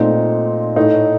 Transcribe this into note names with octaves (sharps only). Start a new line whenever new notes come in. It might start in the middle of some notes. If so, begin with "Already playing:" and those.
Already playing: A#2 A3 C4 D#4
A2 A3 D#4